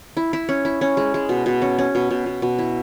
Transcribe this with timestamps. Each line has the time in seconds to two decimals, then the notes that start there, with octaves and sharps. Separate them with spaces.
0.17 E4
0.33 E4
0.49 C#4
0.65 E4
0.81 C#4
0.97 G#3
1.14 G#3
1.29 B2
1.46 B2
1.62 C#4
1.78 C#4
1.95 B2
2.11 B2
2.26 B2
2.42 B2
2.59 E4